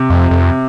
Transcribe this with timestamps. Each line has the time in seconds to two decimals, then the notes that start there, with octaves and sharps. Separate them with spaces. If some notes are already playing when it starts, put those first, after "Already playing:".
Already playing: C3
0.10 F2
0.31 F2